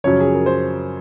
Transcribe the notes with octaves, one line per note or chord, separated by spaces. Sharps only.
F#2 C#3 F3 C#5
G#4
A#4
C5